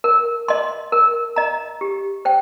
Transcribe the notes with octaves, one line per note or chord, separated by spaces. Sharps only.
A#4
D#5 C6
A#4
D#5 A#5
G4
C5 G5